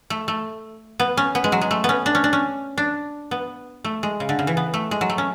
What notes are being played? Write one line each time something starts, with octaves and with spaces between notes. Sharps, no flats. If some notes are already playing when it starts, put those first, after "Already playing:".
A3
A3
B3
C#4
B3
G#3
F#3
G#3
A3
B3 C#4
D4
C#4
D4
C#4
D4
B3
A3
G#3
C#3
D3
C#3
E3
B3
A3
G#3
F#3
A3
C#4